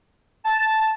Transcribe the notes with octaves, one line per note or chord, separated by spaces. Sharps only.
A5